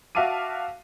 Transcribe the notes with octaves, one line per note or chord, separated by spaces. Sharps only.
F#4 E5 F5 A5 D6 D#7